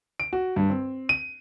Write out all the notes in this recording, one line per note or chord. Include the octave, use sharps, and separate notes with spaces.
D7
F#4
G2
C4
D#7